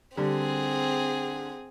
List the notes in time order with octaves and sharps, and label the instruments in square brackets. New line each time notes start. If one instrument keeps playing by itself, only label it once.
[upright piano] D3 G3 [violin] C4 G#4